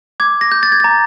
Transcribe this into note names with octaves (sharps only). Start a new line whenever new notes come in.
D6 G#6
A#6
G6
A6
G#6
A#5 A6